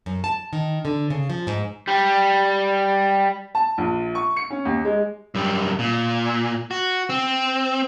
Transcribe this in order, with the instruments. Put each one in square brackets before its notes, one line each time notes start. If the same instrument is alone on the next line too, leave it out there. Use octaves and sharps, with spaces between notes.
[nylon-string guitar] F#2
A5
D#3
D3
C#3
F3
G#2
[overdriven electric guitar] G3
[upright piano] A5
A#1
C#6
C#7
C#4
D#2
G#3
[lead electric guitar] F#2 G3
A#2
F#4
C4